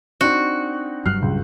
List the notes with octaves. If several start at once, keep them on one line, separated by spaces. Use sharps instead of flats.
C4 D4 D#4 F#4
F#1 G2 F#3 F6 F#6 C7
C#2